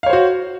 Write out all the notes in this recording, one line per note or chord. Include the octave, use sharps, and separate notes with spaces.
F#4 C5 C#5 F5